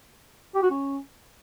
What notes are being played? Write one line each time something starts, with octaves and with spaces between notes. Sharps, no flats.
G4
F#4
C#4